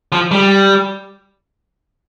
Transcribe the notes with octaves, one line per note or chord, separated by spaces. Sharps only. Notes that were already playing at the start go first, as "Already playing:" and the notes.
F3
G3